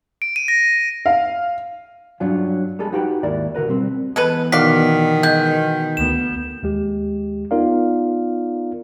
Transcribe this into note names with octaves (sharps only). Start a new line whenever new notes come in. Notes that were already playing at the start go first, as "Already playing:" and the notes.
D7
D#7
A#6
F5
G2 F#3 C#4 D4 F4
G3 G#3 G#4 A4
D#4 F#4 G4 B4 F#5 G5
D#2 G#2 E4 A#4 D5
D3 F#4 A#4 B4
B2 G3 C4
E3 G#3 B3 A4 B4
B2 D#3 F#4 D5 F5 B6
G#3 G6
D2 B3 E7
D#2 G#3 G4
B3 D#4 F4 A#4 D5 F5